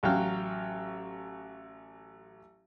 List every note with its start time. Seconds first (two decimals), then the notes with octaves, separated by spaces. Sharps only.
0.03 A1 F#3 F5 G5 F6